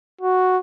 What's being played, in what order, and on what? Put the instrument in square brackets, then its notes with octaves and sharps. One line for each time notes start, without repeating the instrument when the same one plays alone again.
[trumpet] F#4